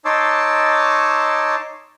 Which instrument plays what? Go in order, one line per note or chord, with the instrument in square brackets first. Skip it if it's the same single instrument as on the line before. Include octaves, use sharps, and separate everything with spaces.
[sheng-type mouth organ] D#4 C#5 A5 C6 D6 E6